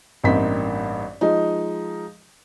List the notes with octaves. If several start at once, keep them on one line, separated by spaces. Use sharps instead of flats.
A1 G2 A#3 C4 D#4 B6
F3 G#3 D#4